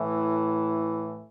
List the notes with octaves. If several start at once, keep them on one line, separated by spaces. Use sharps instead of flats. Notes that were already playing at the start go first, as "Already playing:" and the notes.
Already playing: A2 E3